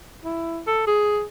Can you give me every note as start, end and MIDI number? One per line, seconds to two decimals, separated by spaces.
0.24 0.61 64
0.67 0.84 69
0.87 1.24 68